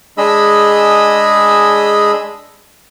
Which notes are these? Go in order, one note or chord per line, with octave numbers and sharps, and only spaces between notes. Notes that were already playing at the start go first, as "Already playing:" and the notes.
G#3 D4 G#4 D#5 B5 E6